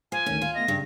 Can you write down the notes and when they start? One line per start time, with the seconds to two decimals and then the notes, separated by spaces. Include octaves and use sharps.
0.12 F3 G#5
0.26 D2 D#3 A3 C#4
0.42 F4
0.55 A3 B3 D#5 A#6
0.68 G2 C#3 G3